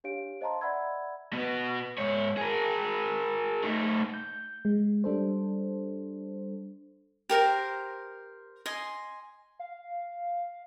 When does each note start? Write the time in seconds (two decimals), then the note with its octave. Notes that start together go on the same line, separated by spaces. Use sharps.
0.04 D4 G4 C#5 F5 D7
0.41 C5 D#5 F5 A5 A#5 C6
0.61 D5 E5 F#5 B5 E6 G#6
1.33 B2 B3
1.98 G#2 C#5
2.37 G#4 A#4
3.64 A3 D#4
4.14 G6
4.65 G#3
5.04 G3 D4 A4 C5
7.29 G4 A#4 C5 A#5
8.66 D#5 G#5 C6
9.59 F5